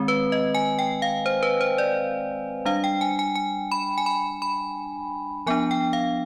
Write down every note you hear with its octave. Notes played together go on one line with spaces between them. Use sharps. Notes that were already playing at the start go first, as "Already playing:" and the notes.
Already playing: D#3 G#3 C4
B4
D#5
G#5
G5
F5
C5
B4
C5
D5
G3 D4 F5
G5
G#5
G#5
G#5
B5
G#5
B5
B5
F3 B3 D4 G#5
G5
F5